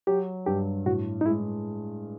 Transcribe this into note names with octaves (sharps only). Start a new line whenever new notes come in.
F#3 G4
G2 G4
A2 F#4
D#4
G#3 E4